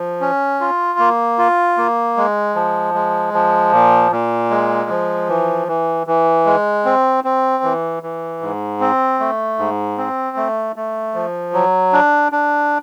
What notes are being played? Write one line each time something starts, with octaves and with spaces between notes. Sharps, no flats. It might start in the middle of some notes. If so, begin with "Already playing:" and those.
Already playing: F3
C#4
F4
A#3
F4
A#3
G#3
F3
G#3
F3
A#2
A#2
G#3
F3
E3
E3
E3
G#3
C4
C4
E3
E3
G#2
C4
A3
G#2
C4
A3
A3
F3
F#3
D4
D4